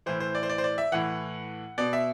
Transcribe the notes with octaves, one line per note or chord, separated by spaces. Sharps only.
A2 E3 C5
C5
D5
C5
D5
C5
D5
E5
A2 E3 F#5
B2 D5
E5